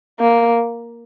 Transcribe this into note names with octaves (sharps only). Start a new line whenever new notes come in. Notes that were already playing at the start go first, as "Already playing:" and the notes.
A#3